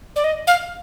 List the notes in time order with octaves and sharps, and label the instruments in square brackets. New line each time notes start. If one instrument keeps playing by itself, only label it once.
[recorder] D5
D#5
F5